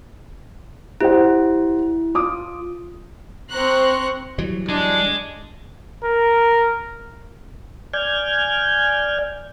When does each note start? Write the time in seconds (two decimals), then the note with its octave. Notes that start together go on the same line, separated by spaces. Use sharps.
1.01 E4 G4 C5 F#5
2.14 F4 D6 D#6
3.51 C4 C5 A#5 C6 C#6 F#6
4.38 E3 F#3 G3
4.69 D4 G#4 D#5
6.05 A#4
7.93 D5 G#5 F6 G6 G#6